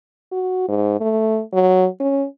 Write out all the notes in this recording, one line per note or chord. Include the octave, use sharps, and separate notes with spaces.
F#4
G#2
A3
F#3
C#4